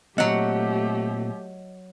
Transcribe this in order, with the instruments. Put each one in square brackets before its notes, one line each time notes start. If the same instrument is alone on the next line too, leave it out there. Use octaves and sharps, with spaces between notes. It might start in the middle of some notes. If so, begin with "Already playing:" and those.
[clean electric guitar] A#2 C4 [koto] F#3 F#5 [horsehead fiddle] A3 G4 [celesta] D#5